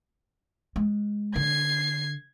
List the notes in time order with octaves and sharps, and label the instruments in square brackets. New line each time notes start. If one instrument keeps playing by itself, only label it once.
[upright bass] G#3
[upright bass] D3 [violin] G#6 C7